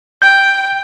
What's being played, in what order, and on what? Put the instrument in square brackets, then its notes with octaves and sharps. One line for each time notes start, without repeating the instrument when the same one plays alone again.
[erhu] G5 [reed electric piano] G6